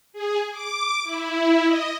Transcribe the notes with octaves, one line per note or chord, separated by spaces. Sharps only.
G#4
D6
E4
D#5